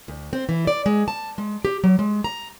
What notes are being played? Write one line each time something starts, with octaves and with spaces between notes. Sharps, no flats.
D2
C4
E3
D5
G#3
A5
G#3
G4
F#3
G#3
A#5